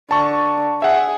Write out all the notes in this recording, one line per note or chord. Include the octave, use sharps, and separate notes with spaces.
D3 A5 C#6
G#4 E5 F#5